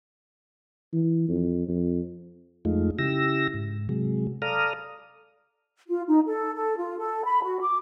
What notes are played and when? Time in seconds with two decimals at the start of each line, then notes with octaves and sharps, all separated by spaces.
0.93 E3
1.28 F2
1.68 F2
2.65 F2 G#3 A3 D#4 F4
2.99 C#3 E4 G4 E6 A#6
3.54 G#2
3.89 C3 F#3 G#3
4.42 A4 D5 F5 A#5 D#6 F6
5.89 F4
6.08 D#4
6.27 A4
6.55 A4
6.77 F4
6.98 A4
7.25 B5
7.44 F#4
7.60 D6